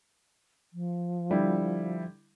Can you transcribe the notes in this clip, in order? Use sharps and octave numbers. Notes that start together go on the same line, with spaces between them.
F3
D3 G3 E4